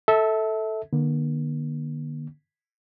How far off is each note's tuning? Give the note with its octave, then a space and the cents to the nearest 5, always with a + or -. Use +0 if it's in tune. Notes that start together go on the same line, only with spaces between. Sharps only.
A4 +0 E5 -25
D3 +40 A#3 +40